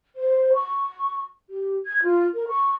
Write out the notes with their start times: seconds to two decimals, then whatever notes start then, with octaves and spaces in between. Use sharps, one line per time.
0.16 C5
0.54 C#6
1.48 G4
1.86 G#6
2.03 F4
2.34 A#4
2.48 C#6